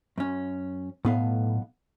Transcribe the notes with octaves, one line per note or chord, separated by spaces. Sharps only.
F#2 C#4
B1 A2 B3 F5